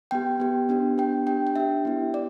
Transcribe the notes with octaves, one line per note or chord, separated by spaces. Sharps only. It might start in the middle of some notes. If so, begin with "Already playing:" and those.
B3 G4 G5
B3 G4
B3 D4 G4
B3 D4 G4 G5
D4 G4 G5
G5
D4 G4 E5
B3 E4 G4
B3 D5